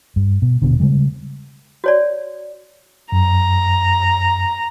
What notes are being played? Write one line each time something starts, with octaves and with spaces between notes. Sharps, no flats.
G2
B2
D#1 B2 D3
C#3 G3 G#3
F#4 C#5 D5
F#2 A#5